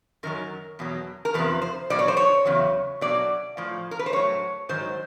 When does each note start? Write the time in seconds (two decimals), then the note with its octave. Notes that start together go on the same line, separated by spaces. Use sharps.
0.23 F#2 D#3 F#3 A#4
0.79 E2 B2 F#3
1.25 A#4
1.34 E2 C3 F3 B4
1.62 C5
1.90 B2 F#3 D5
1.99 C#5
2.08 C5
2.17 C#5
2.45 E2 C#3 F#3
3.01 B2 F#3 D5
3.57 A2 F3
3.91 A#4
3.99 B4
4.06 C5
4.13 A2 F#3 C#5
4.69 G#2 D#3 F#3 C5